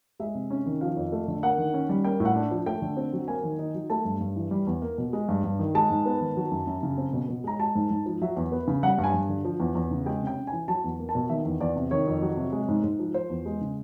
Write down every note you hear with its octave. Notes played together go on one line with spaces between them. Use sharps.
G#3 E5
C3
C#4
D#3
F3 F5
F2
A3
D3
A#3 F#5
D#3
C#4
G3
A#3 G5
A2
F#5
D4
F3
A3 G5
D3
C4
F#3
A#3 G#5
D#3
D#4
F#3
A3 A5
G2
G2
E3
G3
E2
A#3
B2
G#3
G2
G2
D#3
G#3 A5
G#2
B3
D#3
F#3
F#2
F#2
C#3
C4
B2
B2
G#3 A#5
G#3 A5
G#2
G#2
F3
F#3 E5
E2
B3
C#3
G3 F#5
G2
G#5
G2
D3
F3
E2
E2
C#3
G#3 G5
C3 G5
C#4
E3 G#5
F#3 A5
E2
A#3
A5
B2
D#3 E5
E2
E2 D5
C3
D#3 C#5
F2
F#3
C3
G#3
G#2
G#2
F3
F3 C5
E2
G#3
C#3